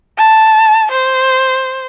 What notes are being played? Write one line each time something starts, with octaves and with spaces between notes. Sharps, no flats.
A5
C5